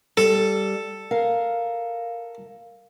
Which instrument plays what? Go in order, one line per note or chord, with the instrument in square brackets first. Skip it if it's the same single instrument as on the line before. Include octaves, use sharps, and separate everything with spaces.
[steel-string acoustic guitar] G3 [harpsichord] A4
[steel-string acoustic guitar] A#4 F5